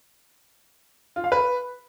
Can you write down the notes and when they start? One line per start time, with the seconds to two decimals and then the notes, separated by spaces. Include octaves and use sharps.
1.16 F4
1.24 F5
1.32 B4